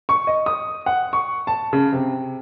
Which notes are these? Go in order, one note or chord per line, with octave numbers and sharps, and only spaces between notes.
C#6
D#5
D#6
F#5
C#6
A5
C#3
C3